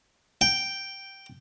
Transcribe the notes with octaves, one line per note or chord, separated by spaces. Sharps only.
G5